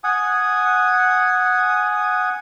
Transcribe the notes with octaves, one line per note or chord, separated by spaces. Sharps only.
F#5 G#5 D#6